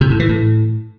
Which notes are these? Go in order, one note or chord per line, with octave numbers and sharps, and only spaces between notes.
C3
A2
E3
A2